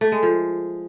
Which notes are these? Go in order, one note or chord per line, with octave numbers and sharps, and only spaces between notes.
A3
G#3
F3